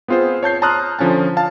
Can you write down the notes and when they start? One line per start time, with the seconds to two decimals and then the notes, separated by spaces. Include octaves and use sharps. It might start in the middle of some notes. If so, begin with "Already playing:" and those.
0.08 B3 C4 F4 G#4 C5
0.43 C#5 A5 G6 C7
0.62 A5 A#5 C6 D#6 F6 F#6
0.99 D3 F3 C#4 G#5 A5
1.37 F5 A5 A6